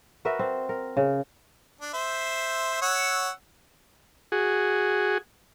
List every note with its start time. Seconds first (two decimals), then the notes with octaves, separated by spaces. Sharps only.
0.25 F#4 A#4 B4 E5
0.39 C4
0.69 A#4
0.97 C#3
1.81 D4
1.94 C5 E5
2.82 C#5 F#5 E6
4.32 F#4 G#4